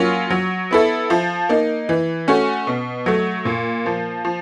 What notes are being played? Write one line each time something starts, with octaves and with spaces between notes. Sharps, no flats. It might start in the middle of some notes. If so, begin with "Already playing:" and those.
Already playing: F#3 A#3 C#4 F4
F#3
B3 E4 A4
F3
A#3 D#4
E3
A3 C#4 F#4
B2
F#3 A3
A#2
F3 A#3
F3